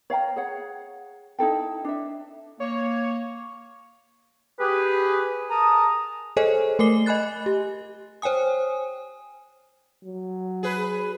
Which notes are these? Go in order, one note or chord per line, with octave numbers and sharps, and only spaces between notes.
C#5 F5 G5 A#5
G#4 C#5 F#5
D#4 E4 A4 G5
D4 E5
A#3 C#5
G4 G#4 B4
G#4 A#4 A5 A#5 D#6
G#4 A4 C5 C#5 D#5 G#5
A3 A#4 G#5 D6 C7 G7
D#5 G#5 B5 F#6 A6
G4
C5 C#5 G5 G#5 D#6
F#3
G#4 B4